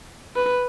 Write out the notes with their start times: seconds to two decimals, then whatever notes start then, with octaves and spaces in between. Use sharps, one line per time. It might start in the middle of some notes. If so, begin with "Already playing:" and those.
0.36 B4